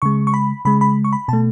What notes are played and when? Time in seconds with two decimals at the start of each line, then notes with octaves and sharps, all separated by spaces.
0.02 C#3 G#3 C#6
0.27 C#6
0.34 B5
0.65 C#3 G#3 B5
0.81 B5
1.04 C#6
1.13 B5
1.28 B2 A3 A5